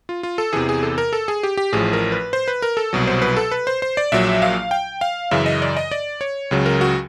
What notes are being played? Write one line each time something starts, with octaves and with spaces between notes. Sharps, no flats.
F4
F4
A4
E2 C3 E3 G#4
G#4
A4
A#4
A4
G#4
G4
G4
A1 A2 F3 G#4
A#4
B4
C5
B4
A#4
A4
C2 B2 F#3
C5
B4
A4
B4
C5
C5
D5
A#1 A#2 F#3 E5
F5
G5
F5
F#2 C#3 E3 E5
D#5
D5
D#5
D5
C#5
C#2 C#3 F#3
A#4
F#4